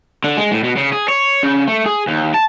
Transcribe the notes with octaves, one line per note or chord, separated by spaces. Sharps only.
D3
G#3
A2
B2
C#3
G#4
C#5
C#3
A3
G#4
D#2
A5